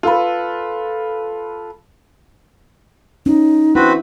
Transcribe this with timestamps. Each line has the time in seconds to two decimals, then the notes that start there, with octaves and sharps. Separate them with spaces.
0.03 F4 A4 B4
3.26 C#4 D#4
3.75 C4 D4 E4 F#4 B4